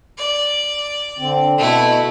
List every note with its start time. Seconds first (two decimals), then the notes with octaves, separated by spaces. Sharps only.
0.18 D5
1.18 D3 C4
1.58 B2 A3 E4